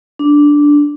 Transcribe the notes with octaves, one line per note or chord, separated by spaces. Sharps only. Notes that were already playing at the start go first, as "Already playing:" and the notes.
D4